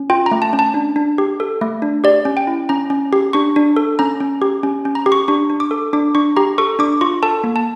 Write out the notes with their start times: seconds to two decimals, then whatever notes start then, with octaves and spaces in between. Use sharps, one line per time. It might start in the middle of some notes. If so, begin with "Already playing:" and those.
Already playing: C#4
0.10 F4 G5
0.26 A#5
0.31 A3
0.42 A5
0.53 C#4
0.59 A5
0.74 D4
0.96 D4
1.18 G4
1.40 A4
1.61 A3
1.82 D4
2.04 G4 D5
2.25 C#4
2.37 G5
2.47 E4
2.69 C#4 A#5
2.90 C#4
3.13 G4
3.33 D4 C#6
3.56 D4
3.76 A4
3.99 C#4 A#5
4.20 C#4
4.42 G4
4.63 C#4
4.85 C#4
4.95 A#5
5.06 G4
5.12 C#6
5.28 D4 C#6
5.50 D4
5.60 D6
5.71 A4
5.93 D4 D6
6.15 D4 C#6
6.36 G4 A#5
6.58 A4 C#6
6.79 D4 D6
7.01 F4 C#6
7.23 A4 A5
7.44 A#3
7.56 A5